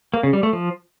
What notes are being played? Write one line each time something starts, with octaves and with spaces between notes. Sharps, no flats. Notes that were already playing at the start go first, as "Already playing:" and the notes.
A#3
C#3
G3
A3
F3